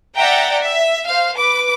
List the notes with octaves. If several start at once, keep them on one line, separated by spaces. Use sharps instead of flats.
D5 E5 F#5 G5 A#5
E5
C5 F5
B4 D6